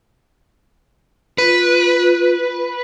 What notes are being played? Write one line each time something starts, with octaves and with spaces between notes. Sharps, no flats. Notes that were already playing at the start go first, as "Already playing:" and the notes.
F4 B4